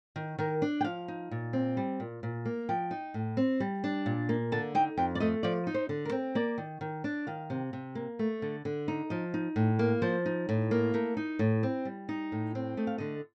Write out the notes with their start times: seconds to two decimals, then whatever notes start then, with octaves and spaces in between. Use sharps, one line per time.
0.16 D#3
0.39 D#3 A#4
0.62 D4
0.81 G5
0.84 F3 F5
1.08 D#4
1.31 A#2
1.53 C4
1.77 G3
2.00 A#2
2.23 A#2
2.45 A#3
2.69 F3 G5
2.91 D#4
3.14 A2
3.37 C4
3.60 G3
3.84 D4
4.06 A#2
4.29 A#3
4.52 D3 A5
4.75 D#4 G5
4.97 F2 G5
5.15 D5
5.20 A3 D#5
5.43 F3 D5
5.67 D#4
5.74 C5
5.89 D3
6.05 A#4
6.12 C4
6.35 A#3 D5
6.58 D#3
6.81 D#3
7.04 D4
7.27 D#3 F5
7.50 C3
7.73 C3
7.95 A#3
8.19 A3
8.42 D3
8.65 D3
8.88 D#4
9.10 F3 D#5
9.34 D#4
9.56 A2
9.79 A#3
10.02 F3 C5
10.26 D#4
10.49 A2
10.71 A#3
10.94 A3 A#4
11.17 D#4
11.39 A2
11.63 C4
11.85 G3
12.09 D#4
12.32 A2
12.55 C4
12.77 A3 D#5
12.87 F5
12.98 D3 D#5